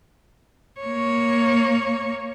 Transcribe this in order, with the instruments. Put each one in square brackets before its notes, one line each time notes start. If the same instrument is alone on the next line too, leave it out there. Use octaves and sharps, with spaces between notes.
[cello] A#3 C#5